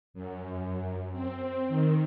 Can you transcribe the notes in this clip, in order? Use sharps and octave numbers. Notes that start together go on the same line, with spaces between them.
F#2
C4
D#3